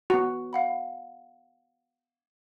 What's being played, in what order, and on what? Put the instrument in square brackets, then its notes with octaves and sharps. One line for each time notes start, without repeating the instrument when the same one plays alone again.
[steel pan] B3 F#4
[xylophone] F5 F#5 B5